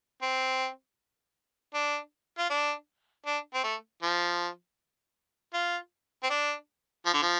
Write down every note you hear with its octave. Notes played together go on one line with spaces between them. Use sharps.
C4
D4
F4
D4
D4
C4
A3
F3
F4
C4
D4
F3
D3
F3